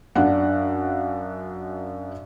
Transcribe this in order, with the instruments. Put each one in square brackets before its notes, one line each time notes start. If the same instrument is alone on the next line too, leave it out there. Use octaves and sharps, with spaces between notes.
[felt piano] F#2 D4 F5 F#5